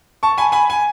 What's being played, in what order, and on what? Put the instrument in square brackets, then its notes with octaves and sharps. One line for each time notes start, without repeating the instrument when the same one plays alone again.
[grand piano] A5 C#6
G#5 B5
G#5 B5
G#5